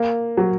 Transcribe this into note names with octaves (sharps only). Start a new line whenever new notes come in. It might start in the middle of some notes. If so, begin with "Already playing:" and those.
Already playing: A#3
F#3